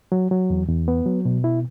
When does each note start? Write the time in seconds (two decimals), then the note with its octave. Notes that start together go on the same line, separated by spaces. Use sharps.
0.12 F#3
0.31 F#3
0.50 E2
0.69 E2
0.88 B3
1.06 F#3
1.25 B2
1.44 E4